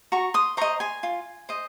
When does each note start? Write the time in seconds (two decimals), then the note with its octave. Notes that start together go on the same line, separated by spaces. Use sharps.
0.12 F#4 A#5 C#6
0.34 C6 D#6
0.57 C5 D#5 A#5 C#6
0.80 G#5 C6
1.03 F4
1.49 C5 D#5